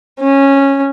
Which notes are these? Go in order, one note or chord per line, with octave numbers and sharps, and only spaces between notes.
C#4